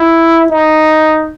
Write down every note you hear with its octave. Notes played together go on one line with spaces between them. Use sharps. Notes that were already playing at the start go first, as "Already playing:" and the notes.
Already playing: E4
D#4